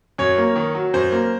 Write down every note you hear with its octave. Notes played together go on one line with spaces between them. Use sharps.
F#2 C#5
A#3
D#3
F#3
F#2 C5
A#3